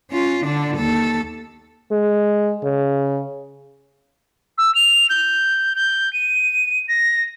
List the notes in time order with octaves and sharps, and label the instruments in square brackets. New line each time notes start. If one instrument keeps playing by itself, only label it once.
[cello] C#4 F4
D3 D4
D#2 A4
[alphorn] G#3
C#3
[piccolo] E6
F7
G6
G6
D#7
A#6